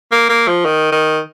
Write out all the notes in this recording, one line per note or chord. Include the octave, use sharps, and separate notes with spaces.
A#3
A#3
F3
D#3
D#3